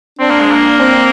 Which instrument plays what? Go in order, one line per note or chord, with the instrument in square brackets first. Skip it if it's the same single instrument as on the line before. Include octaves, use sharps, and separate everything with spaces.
[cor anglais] C4 [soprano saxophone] D4
[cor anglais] A#3
G#3
A#3
[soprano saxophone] C4